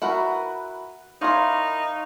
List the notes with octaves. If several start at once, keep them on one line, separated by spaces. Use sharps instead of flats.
E4 F#4 A#4 B4
D#4 E4 A#4 C#5 F5 C6